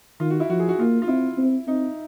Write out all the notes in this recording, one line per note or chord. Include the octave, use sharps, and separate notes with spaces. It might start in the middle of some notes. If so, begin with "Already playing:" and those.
D#3 F4
F#4
E4
F3 F#4
G#4
F#4
A#3 F4
F4
C4 E4
C4
C4 D#4